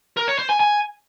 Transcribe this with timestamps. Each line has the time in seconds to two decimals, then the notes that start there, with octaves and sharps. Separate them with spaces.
0.17 A#4
0.28 C#5
0.39 C5
0.50 G#5
0.60 G#5